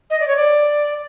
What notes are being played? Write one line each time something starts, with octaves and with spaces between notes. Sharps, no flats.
D#5
D5
C#5
D5